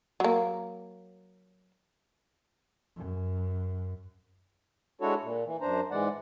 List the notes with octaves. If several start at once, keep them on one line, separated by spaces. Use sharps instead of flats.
F#3 A#3
F#2
G#3 D4 E4 F#4 A4 C#5
A#2
E3
F#2 D4 C5 A#5
G#2 E3 G#3 D5 F#5